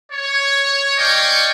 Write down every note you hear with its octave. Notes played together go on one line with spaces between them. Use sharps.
C#5
D5 D#5 F5 G5 G#5 C#6